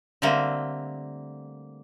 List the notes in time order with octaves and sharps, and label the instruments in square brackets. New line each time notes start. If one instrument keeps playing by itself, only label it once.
[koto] D3 G3 A3 A#3 C4